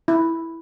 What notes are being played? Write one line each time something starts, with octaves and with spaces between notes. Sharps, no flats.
E4